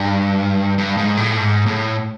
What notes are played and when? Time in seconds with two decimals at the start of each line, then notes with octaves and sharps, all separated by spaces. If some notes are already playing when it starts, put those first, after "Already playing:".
Already playing: G2
0.78 G2
0.97 G#2
1.17 A2
1.37 G#2
1.66 A2